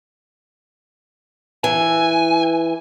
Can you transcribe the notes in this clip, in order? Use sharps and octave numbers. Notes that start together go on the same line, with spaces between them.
E3 G#5